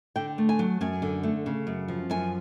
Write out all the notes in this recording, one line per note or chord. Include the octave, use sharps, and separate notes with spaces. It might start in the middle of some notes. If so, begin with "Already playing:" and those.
D3 G5
A3
G#5
F#3
F#2 G#5
D3
A3
C#3
F#2
F3
F#2 G#5